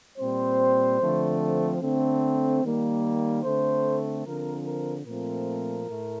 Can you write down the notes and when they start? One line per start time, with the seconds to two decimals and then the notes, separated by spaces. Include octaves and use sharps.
0.19 A#2 G3 C4 C5
0.99 D3 F3 A3 C4
1.81 D3 A3 C4
2.63 D#3 G3 A#3
3.43 D3 A3 C4 C5
4.25 D3 F3 C4 A#4
4.66 A#4
5.06 A#2 F3 A3 C4 A#4
5.88 A2 A3